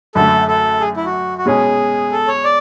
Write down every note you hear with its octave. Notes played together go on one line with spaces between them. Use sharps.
F#2 D3 A3 A4
A4
G#4
E4
F#4
F#4
B2 G#3 C#4 G#4
A4
C#5
D5